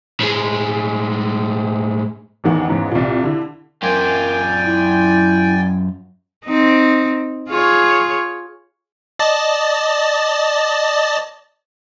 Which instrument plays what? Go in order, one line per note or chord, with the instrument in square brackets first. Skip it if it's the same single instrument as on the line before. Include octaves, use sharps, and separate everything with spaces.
[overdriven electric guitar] A2 G#3
[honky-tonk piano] A1 E2 D#3 F#5
E2 G#2 C#3
C2 A#2
D3 E4
[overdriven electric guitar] F#2 F4 [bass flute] A#4 [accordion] D5 G5 G#5
[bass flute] E4
[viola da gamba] C4 D#4
F4 G#4 C#5
[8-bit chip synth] D5 D#5 A5